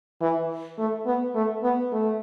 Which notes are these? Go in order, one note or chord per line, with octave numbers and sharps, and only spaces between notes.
E3
A3
B3
A3
B3
A3